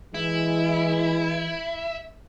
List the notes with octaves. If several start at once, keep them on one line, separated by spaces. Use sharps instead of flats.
E3 G#3 E4